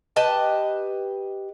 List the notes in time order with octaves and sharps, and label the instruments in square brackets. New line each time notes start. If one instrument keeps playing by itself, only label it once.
[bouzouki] G4 B4 D#5 A5